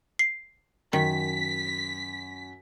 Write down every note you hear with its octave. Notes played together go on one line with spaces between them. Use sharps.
C7
F#2 D#3 B6